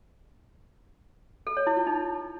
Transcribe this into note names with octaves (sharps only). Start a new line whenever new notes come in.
A4
C#5
E4
F4
D#4